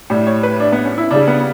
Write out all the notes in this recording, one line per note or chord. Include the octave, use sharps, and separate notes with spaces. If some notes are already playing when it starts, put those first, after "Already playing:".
A2 G3
C#5
B4
D4
B3
C#4
E4
C#3 G3 D4
B3